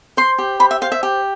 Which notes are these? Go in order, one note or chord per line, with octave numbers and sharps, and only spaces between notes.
C5 C6
G4
C5 B5
E5
C5 F5
E5
G4